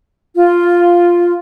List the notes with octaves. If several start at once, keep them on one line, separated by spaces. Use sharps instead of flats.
F4